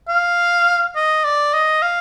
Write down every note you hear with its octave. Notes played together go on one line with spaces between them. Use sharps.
F5
D#5
D5
D#5
F5